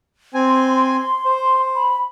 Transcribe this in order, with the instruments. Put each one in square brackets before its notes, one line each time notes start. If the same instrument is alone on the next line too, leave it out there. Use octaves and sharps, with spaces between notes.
[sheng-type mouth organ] C4 G#5
[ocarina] C6
[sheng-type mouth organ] C5
[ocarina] B5